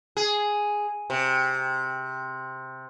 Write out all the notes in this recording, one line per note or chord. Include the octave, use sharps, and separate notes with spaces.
G#4
C3